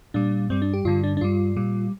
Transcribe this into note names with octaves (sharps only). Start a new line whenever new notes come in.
A#2 G3 D4
G2 G3 C4
D4
G4
G2 D3 G3 F4
D4
D4
G2 G3 F4
A#2 G3